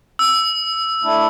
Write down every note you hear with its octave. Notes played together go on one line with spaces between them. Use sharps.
E6
A3 D4 E4